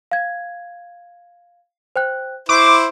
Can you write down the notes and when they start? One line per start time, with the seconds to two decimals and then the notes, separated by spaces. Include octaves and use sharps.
0.11 F5 G#6
1.96 C5 G5 F#6
2.49 E4 C5 C#6 D6